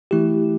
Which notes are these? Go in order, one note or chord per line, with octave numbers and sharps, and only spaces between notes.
E3 A3 E4 G4